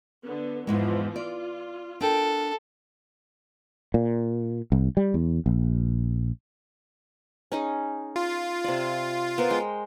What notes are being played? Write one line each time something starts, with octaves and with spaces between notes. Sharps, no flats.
D3 B3
E2 G#2 E3 F3 G#3
F4 D5
D4 A4 A#4 G5
A#2
C2
G3
E2
A#1
C#4 D#4 G#4
F4
C3 D5
B3 A#4 C5
G#3 G5 C6